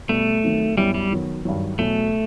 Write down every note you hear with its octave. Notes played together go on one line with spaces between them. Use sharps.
B2 G3 A3 B3
D#3 F#3 C4 D#4
F#2 F#3 G3 B3 E4
G3
D#3 F#3 B3
G2 D#3 F#3
E2 B2 F#3 A3